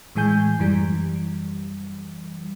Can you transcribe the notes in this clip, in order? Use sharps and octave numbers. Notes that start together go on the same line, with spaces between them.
A2 E3 G#3 G#5 G6
F#2 E3 G3